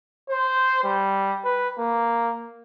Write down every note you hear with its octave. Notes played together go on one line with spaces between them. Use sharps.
C5
G3
B4
A#3